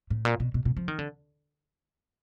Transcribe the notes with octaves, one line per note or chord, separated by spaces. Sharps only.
A2
A#2
B2
B2
B2
F3
D#3
D3